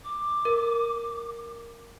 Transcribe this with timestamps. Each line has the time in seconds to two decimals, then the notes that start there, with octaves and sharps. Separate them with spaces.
0.04 D6
0.45 A#4